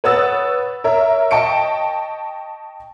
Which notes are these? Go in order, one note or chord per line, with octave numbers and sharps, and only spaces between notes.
B4 C#5 F#5 D#6 E6 A6
A#4 C#5 E5
D#5 G5 A5 C#6 C#7 D7